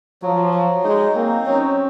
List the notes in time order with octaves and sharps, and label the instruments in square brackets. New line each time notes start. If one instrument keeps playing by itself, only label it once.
[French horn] F3 [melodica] F#3
[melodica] F#3
[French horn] G#3 [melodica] D#4
[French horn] A#3 [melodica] C4
[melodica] F#3 [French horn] C#4